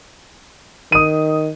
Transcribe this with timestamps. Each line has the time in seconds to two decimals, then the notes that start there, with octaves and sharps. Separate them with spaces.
0.92 D#3 D#6 D#7